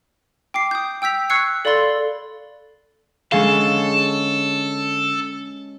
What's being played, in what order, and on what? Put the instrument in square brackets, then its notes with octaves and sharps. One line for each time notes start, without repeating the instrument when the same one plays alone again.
[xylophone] G5 D6 C7
D#6 G6
G5 E6 G6 B6 F7
C#6 E6 F#6 G#6 C7 C#7
A4 D5 F5 B5 C6 A6
A4
[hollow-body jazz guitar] D3 G#4 F5 [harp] G#3 C#4 C#6 [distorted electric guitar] A4